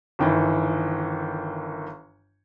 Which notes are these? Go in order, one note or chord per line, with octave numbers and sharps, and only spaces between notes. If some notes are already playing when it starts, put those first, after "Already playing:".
G1 D#3 E3